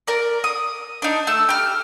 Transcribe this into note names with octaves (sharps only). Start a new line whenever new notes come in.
A#4 D5
D#6
D4 D#4
A3 E6
G4 F6